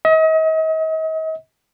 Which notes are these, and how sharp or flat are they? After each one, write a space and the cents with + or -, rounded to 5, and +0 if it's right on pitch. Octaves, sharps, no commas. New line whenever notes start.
D#5 +40